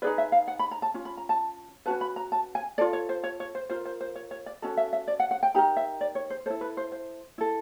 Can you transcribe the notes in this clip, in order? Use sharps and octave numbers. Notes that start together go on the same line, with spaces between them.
D#4 G#4 B4 D5
E5
F5
F#5
B5
A#5
A5
C#4 F4
B5
A#5
A5
C#4 F#4 B4 A5
B5
A#5
A5
G#5
F4 A4 D5
C#5
C5
C#5
C#5
C5
F4 A#4 C5
C5
C5
C#5
C#5
D5
C#4 F#4 A4 D#5
E5
E5
D5
F#5
F#5
G5
D#4 G4 A#4 A#5
E5
D5
C#5
C5
E4 A4 C5
B4
C5
C5
E4 A4